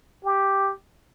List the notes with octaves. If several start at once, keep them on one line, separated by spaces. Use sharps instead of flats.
G4